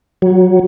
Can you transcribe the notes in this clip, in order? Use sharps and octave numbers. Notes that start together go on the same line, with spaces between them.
F#3